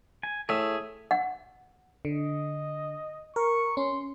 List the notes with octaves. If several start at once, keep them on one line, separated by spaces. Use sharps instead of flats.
G#5
A2 G#4 E5
F#5
D3 D#5
A#4 C#6
C#4 C6